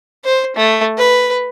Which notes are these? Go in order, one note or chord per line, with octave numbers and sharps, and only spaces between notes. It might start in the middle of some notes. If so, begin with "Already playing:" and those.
C5
A3
B4